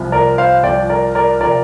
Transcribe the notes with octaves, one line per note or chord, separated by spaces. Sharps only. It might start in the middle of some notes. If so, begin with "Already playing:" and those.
Already playing: C2 C3 F3
A#4 D5
C5 F5
C2 C3 F3 D5 G5
A#4 D5
A#4 D5
C3 F3 A#4 D5